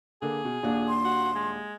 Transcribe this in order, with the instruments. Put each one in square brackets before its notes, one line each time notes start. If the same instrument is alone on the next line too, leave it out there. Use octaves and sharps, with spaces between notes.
[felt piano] D3 A#3 [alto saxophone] G#4
[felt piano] B2
D#1 A#2 D4
[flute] C6
[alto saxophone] F#4
G#3